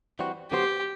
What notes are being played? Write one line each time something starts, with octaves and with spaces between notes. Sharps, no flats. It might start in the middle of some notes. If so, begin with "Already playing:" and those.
E3 G3 C4 F#4
D3 F#3 B3 F#4 G4 C5